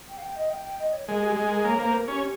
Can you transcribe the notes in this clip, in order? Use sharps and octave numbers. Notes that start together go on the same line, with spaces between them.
G5
F5
G5
D#5
G5
G5
D#5
C#5
G#3 A#4
G4
G#3 G#4
A#4
A#3 C#5
A#3 C5
A#4
C#4 G4